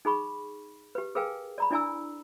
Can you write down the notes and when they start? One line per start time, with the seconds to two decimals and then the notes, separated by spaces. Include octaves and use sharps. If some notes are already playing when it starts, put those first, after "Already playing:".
0.05 D#4 G#4 B5 C#6
0.95 G4 B4
1.15 G#4 A#4 B4 F5 G5 G#5
1.58 D5 A#5 B5
1.71 D4 E4 D5 G#5 A#5 E6